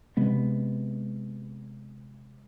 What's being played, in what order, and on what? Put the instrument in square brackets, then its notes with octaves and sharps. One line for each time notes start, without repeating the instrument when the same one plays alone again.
[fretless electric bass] C3 G#3 B3